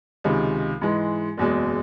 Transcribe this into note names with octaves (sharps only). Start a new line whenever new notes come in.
C#2 C3 D#3 G#3
G#2 E3 G#3
F#1 E2 B2 G#3